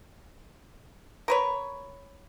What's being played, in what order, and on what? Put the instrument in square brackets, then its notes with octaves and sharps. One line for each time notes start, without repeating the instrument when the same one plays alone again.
[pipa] A#4 B4 C#5